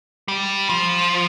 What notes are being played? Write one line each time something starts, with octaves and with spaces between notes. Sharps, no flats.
G3
F3